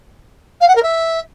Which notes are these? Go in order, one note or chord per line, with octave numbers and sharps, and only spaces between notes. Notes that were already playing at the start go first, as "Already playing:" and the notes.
F5
F#5
A#4
E5